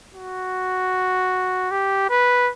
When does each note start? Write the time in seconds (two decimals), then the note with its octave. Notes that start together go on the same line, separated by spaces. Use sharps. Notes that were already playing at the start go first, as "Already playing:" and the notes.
0.14 F#4
1.71 G4
2.09 B4